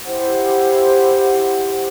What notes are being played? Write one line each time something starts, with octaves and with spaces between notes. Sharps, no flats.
E4 G4 C5 F#5